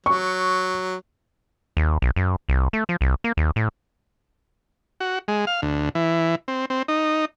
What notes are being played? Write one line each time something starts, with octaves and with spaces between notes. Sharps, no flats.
F#3 C#6
D#2
B1
F#2
C2
A3
F3
C2
A#3
D#2
A2
F#4
G#3
F5
D2
E3
C4
C4
D#4